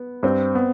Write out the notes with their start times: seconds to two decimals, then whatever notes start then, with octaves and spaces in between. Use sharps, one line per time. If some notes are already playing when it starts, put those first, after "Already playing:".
Already playing: B3
0.23 G2 C4
0.55 B3